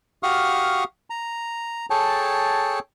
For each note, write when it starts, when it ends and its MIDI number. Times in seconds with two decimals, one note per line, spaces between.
0.23 0.84 66
0.23 0.84 67
0.23 0.84 77
0.23 0.84 85
0.23 0.84 87
0.23 0.84 89
1.10 1.86 82
1.90 2.79 68
1.90 2.79 69
1.90 2.79 73
1.90 2.79 79
1.90 2.79 81